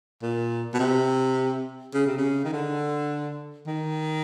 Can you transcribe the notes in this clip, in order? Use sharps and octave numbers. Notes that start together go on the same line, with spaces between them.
A#2
B2
C3
C#3
C3
C#3
D#3
D3
D#3